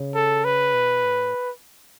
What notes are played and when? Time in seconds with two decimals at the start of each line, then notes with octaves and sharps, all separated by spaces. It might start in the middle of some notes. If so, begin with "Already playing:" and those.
Already playing: C#3
0.15 A4
0.45 B4
0.74 B2
1.03 A2